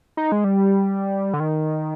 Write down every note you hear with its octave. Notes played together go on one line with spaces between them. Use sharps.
D#4
G#3
G3
D3
D#3